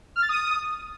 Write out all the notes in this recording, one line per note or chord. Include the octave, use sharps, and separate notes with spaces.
F6
A6
D#6